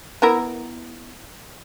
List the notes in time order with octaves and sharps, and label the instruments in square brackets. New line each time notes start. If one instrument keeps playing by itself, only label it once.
[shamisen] B3 E4 A#4